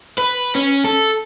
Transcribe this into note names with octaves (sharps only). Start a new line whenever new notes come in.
B4
C#4
A4